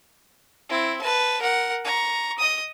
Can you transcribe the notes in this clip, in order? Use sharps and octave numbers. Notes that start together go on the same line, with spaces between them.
C4 E4
B4 A5
A#4 F#5
A#5 C#6
D#5 D#6